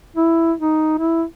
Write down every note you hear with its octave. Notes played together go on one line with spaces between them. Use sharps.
E4
D#4
E4